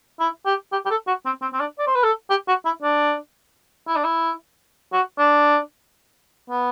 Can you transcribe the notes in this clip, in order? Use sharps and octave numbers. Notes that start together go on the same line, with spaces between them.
E4
G4
G4
G4
A4
F#4
C4
C4
C4
D4
D5
C5
B4
A4
G4
F#4
E4
D4
E4
D4
E4
F#4
D4
B3